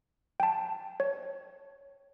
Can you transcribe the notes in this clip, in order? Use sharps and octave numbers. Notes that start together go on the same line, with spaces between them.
G5 A5
C#5